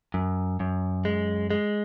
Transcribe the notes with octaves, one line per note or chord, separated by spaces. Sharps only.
F#2
F#2
G#3
G#3